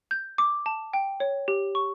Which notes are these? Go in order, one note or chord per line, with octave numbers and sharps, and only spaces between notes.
G6
D6
A5
G5
C#5
G4
C#6